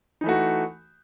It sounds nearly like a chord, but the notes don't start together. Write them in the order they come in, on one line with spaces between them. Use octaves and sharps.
D#4 E3 A3 F#4